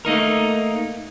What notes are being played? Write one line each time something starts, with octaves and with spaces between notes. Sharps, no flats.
A3 A#3 D#4 A#4